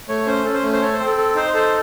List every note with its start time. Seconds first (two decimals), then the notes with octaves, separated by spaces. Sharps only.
0.08 A3 C#5
0.26 C#4 C5
0.45 C#4 A4
0.54 C5
0.63 A3
0.73 C5
0.82 A4 C#5
0.93 C5
1.00 C4
1.06 A4
1.17 A4
1.35 D#4 C5
1.54 A4 C5